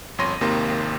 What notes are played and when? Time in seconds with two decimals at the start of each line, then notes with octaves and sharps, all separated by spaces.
0.18 G1 F2 C#5 C6 A#6 D#7
0.41 G#1 D#2 C3 D#3 A#3 C6